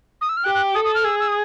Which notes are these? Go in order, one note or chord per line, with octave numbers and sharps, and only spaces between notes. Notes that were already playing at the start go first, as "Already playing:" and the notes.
D#6
E6
F6
G4 F#6
F#6
A4 D#6
D#6
F6
G#4 E6
E6
D#6